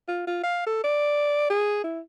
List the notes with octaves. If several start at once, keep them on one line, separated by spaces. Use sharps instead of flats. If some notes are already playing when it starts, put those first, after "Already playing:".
F4
F4
F5
A4
D5
G#4
E4